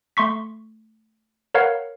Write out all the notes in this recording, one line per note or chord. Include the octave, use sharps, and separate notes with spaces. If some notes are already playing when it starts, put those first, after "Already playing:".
A3 C6 C#6 B6
A#4 B4 C#5 F5 F#5